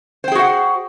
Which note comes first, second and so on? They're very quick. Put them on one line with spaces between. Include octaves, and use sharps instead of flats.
C5 G5 G#4 F#4 F#5